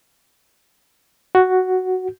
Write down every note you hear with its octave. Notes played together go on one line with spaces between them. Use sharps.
F#4